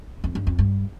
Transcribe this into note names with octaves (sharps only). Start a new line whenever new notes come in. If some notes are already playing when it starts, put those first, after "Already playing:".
F2
G2
F2
G2